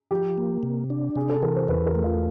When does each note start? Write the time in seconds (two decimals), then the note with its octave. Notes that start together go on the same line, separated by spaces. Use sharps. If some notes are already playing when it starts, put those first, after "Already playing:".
0.11 F3 G4
0.38 A#3
0.63 C3
0.90 D4
1.16 C3 G#4
1.30 A4
1.42 E3 A#4
1.56 C5
1.68 E2 B4
1.86 A#4
1.95 A3
2.04 F4